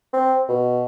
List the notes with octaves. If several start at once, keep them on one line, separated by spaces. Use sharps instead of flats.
C4
B2